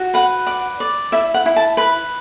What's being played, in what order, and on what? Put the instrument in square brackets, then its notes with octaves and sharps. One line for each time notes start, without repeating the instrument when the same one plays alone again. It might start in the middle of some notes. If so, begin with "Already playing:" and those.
Already playing: [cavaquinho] F#4
B4 F#5
D5 F#5
D5
E4 E5
F#5
E4
A5
B4 B5